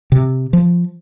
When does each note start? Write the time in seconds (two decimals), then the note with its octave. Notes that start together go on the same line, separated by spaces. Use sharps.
0.12 C3
0.53 F3